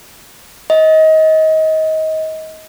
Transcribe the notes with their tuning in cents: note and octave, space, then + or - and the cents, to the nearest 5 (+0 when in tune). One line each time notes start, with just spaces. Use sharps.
D#5 +25